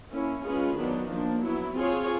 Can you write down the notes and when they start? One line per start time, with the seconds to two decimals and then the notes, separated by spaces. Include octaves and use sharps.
0.11 A#3 C#4 E4
0.44 G#3 C#4 F4 G#4 B4
0.77 D#3 F#3 B3 D4
1.10 F3 A#3 D4
1.43 F#3 B3 E4
1.76 C4 F4 G#4 C#5